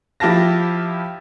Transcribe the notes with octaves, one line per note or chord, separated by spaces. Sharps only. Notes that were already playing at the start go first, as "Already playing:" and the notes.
F3 E4 G4 F5 A5 A#6